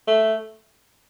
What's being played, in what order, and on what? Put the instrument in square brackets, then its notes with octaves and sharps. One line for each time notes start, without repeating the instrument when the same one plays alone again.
[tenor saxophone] A3